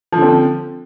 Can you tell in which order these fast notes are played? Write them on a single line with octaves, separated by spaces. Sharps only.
F3 D3 C4